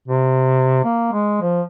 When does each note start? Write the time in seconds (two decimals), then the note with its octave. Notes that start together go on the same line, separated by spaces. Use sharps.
0.08 C3
0.84 A#3
1.12 G#3
1.41 F3